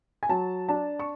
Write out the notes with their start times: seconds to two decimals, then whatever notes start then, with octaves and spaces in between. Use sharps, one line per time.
0.23 G#5
0.29 F#3 A5
0.68 D4 A5
0.99 C#6